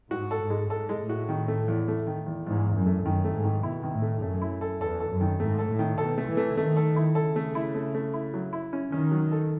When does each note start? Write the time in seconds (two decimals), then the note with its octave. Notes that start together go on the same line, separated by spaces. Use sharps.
0.11 G#2 F#4
0.31 A4
0.41 G#2
0.50 G#3
0.70 G#2 A4
0.89 G#3
0.99 A2
1.09 F#4
1.29 D#3
1.48 A3
1.68 E2
1.88 A3
2.07 D#3
2.26 E2
2.47 E2 G#2
2.65 E2
2.75 F#2
2.86 A3
3.05 F#2 D#3
3.25 A3
3.34 G#2
3.44 D#3
3.63 B2 E4
3.83 D#3
3.93 A2
4.02 A3
4.22 F#2 A3
4.42 E4
4.61 A4
4.81 E2 A4
5.00 A4
5.10 F#2
5.21 D#3
5.39 G#2 A3
5.59 A4
5.69 A2
5.79 D#3
5.98 B2 A4
6.18 A3
6.28 E3
6.37 A3
6.57 D#3 A3
6.77 A4
6.96 E4
7.15 C#3 A4
7.36 A3
7.55 E4
7.75 A3
7.95 A3
8.14 E4
8.34 F#3
8.53 E4
8.73 C#4
8.91 D#3 C#4
9.11 F#3
9.32 A4